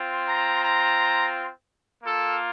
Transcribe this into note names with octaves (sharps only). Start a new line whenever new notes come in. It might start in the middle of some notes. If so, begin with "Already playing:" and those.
Already playing: C4 F4
A#5
A#5
A#3 F4 A4